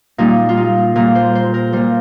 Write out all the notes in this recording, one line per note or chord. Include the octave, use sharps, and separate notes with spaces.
A#2 G3 D#4
F4
D#4
A#2 G3 A#4
C5
C5
A#4
A#2 G3 C5